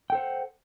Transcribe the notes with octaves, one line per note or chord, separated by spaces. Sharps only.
A4 C5 F#5 G5